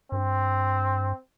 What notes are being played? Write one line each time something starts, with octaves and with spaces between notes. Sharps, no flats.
G2 C4